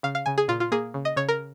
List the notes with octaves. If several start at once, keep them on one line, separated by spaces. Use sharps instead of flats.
C#3 F5
F5
C#3 G#5
G#4
A#2 F4
F4
A#3 G#4
C#3
D#5
C#3 C#5
A#4